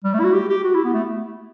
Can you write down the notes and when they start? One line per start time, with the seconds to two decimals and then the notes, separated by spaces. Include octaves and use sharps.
0.04 G3
0.14 A3
0.20 E4
0.24 F#4
0.33 G4
0.49 G4
0.64 F#4
0.74 E4
0.84 B3
0.94 A3